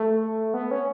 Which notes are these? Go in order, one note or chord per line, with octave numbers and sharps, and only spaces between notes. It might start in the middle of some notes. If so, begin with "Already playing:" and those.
Already playing: A3
B3
C#4